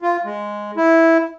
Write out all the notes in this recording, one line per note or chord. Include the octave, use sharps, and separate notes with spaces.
F4
G#3
E4